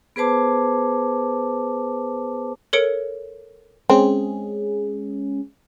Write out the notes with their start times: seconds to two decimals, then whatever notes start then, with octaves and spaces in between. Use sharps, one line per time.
0.16 B3 G#4 B4 C5 A5 D6
2.73 A4 A#4 C#5 C#7 D7
3.90 G#3 C4 C#4 G#4